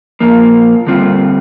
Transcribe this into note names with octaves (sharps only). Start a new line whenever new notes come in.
A#2 F3 A#3
D3 G3 C4 F4